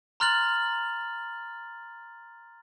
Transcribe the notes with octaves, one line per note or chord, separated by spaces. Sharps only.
A#5 C6 F6 F#6 A6 F#7